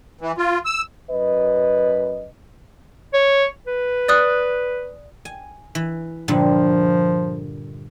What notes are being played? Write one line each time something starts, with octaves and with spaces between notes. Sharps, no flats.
E3
F4
E6
F#2 B4 D#5
C#5
B4
D5 D#6 F#6
G#5
E3
G2 A#2 D3 F3